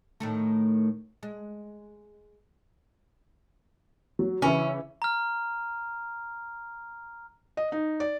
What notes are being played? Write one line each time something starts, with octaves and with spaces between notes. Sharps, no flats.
A2 D#3 A3
G#3
F#3
C#3 E3 C#4 E4
A#5 F6
D#5
D#4
D5